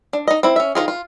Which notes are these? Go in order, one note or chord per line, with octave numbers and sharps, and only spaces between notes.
D4
D#4 D#5
C4 E4
C#4 E5
D#3 F3 F4 G#4
F4